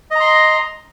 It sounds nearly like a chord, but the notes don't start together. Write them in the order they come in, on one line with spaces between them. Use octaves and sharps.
D#5 A#5 C6